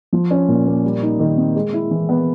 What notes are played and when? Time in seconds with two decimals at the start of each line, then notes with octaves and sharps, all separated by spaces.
0.13 F3
0.31 C#4
0.48 A#2
0.66 A#3
0.84 G3
1.02 D#4
1.19 D#3
1.37 C4
1.55 G#3
1.73 E4
1.91 E3
2.09 B3